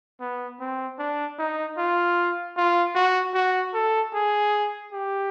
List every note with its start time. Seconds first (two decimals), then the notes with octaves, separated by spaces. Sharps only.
0.20 B3
0.60 C4
0.99 D4
1.39 D#4
1.78 F4
2.57 F4
2.95 F#4
3.34 F#4
3.74 A4
4.14 G#4
4.93 G4